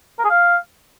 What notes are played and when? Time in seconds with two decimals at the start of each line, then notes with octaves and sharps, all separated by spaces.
0.19 A#4
0.24 G#4
0.30 F5